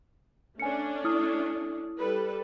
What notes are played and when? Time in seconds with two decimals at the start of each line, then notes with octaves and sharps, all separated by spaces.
0.60 A3 C#4 D4 G#5 C#7
1.04 E4 D#6 F6
1.97 G3 A4 B4